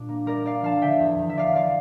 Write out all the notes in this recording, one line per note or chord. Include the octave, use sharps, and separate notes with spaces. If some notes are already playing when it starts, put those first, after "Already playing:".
Already playing: A#2 G3 D4
A#3
G3 A#4 D5
D4 D5 F5
F3 F5 A5
D3 E5 G5
E2
E2
E5
F3 D5 F5
F3 D5 F5